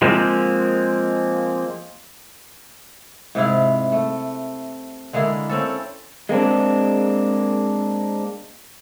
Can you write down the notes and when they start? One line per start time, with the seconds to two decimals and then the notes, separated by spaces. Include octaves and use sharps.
0.02 F3 G#3 A#3 C4
3.35 G#2 C3 E4 F5
3.92 A3
5.13 D3 G#3 A#3 E4
5.50 C4 C#4 A4
6.29 G#3 A#3 C4 D4